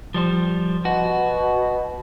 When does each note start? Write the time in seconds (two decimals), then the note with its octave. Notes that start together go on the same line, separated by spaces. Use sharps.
0.14 F3 G3 C5
0.85 B2 F#4